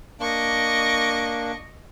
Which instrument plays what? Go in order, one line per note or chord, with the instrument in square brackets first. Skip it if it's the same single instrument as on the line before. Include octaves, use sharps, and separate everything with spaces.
[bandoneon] A#3 D4 [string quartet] D#5 C#6 D6